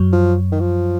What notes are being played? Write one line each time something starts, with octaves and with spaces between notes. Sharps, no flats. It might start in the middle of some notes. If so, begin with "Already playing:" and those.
Already playing: F#2 F#3
F3
D#3
F3